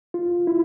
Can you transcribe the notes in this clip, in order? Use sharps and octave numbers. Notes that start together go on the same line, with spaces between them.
F4
E4